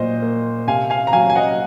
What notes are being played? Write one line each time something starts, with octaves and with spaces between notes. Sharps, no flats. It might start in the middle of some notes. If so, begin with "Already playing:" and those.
Already playing: A#2 F#3 C5 D#5
A#3
C3 F5 G#5
F5 G#5
A#5
F#3 F5 G#5
G#5
D#5 F#5